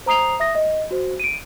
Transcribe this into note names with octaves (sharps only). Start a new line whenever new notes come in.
C5 A#5 D#6 C7 F7
E5 D#6 A#6
D#5
F#4 C5
D7 D#7